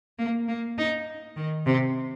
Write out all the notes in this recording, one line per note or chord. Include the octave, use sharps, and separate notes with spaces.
A#3
A#3
D#4
D#3
C3